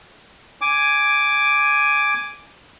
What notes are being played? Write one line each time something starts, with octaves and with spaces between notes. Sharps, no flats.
G#5 D6